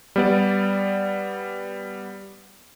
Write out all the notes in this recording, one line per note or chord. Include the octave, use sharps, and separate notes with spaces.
G3 B3 D5